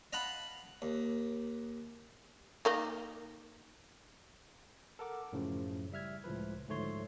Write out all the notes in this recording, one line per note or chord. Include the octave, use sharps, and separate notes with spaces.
D#5 F5 F#5 A5 B5
D#2
D#3 A#3 D#4
A4 A#4 F#5 D6
F#2 A2 C#3 F3
G3 E5 F6 G#6
C#2 A2 F3 B4
D2 G#2 F3 A3 C#5 C6